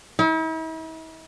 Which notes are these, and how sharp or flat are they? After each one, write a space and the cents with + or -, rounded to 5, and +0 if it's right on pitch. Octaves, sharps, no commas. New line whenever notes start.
E4 -45